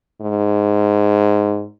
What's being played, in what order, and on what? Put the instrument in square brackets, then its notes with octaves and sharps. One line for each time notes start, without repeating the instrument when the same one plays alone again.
[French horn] G#2